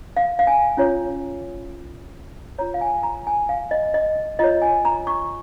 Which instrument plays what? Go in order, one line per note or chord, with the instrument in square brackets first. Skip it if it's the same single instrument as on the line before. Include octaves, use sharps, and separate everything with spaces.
[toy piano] F5
F5
G#5
C#4 F4 C#5
F4 C#5 A#5
F5
G#5
A#5
G#5
F5
D#5
D#5
F4 C#5 D#5
G#5
A#5
C#6